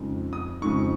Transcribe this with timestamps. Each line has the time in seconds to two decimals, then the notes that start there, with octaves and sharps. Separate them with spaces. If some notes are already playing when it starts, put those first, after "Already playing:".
Already playing: F2 C#3 G#3 D#4
0.33 D#6
0.62 F2 C#3 G#3 D#4 C#6